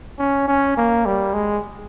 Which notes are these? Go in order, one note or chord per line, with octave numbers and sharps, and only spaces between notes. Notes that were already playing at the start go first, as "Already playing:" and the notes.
C#4
C#4
A#3
G3
G#3